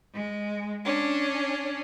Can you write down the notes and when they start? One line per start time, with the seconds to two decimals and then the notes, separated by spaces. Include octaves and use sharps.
0.13 G#3
0.85 C#4 D4